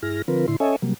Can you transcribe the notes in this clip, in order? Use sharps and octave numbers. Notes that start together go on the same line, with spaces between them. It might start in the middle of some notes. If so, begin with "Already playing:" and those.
G2 E4 G#4 F6 A#6
D3 F3 C4 F4 A#4 B4
A2 D3 E4 C6
C#4 A4 C#5 D#5 E5 G#5
C3 F#3 G3 A#3